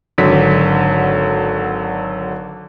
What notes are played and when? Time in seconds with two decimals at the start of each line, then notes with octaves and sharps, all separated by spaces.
0.18 G#1 D3 F#3 B6